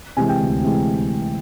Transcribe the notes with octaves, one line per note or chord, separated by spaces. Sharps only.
C3 E3 G#3 G#5
G5
D2
C3 E3 G#3